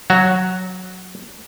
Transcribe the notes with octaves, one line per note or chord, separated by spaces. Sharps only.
F#3 F#4